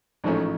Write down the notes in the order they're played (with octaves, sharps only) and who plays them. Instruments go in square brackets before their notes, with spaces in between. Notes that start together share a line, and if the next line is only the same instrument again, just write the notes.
[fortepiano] A1 G#2 F3 A3 C#4